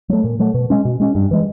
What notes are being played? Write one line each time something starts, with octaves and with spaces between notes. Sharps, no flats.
F#3 A3
A#2
F#3 A3
B2
G#3 C#4
B2
G#3 C#4
G2
E3 G#3